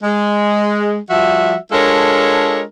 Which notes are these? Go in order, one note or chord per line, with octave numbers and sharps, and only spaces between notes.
G#3
F3 G3 F#4 E5
G#3 D4 F4 A4 A#4 C#5